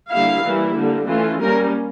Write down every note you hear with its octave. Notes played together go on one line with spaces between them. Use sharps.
D3 G3 A#3 E4 F5
E3 G3 A#3 E4
D3 G3 A#3
E3 A3 C#4 F4
G3 A#3 C#4 A#4